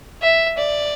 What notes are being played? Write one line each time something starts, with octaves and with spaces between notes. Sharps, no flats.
E5
D5